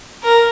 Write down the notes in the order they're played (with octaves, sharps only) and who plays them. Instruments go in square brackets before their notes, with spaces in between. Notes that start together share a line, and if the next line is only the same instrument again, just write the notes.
[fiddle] A#4